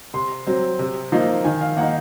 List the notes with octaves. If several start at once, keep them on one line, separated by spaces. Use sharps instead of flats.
C3 C6
F#3 C4
C3
F3 A#3 D#4
D#3 G#5
F5
A#3 D#4 F#5